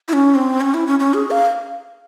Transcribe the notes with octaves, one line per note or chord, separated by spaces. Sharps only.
E4
C#4
C4
C#4
E4
C#4
C#4
G#4
F5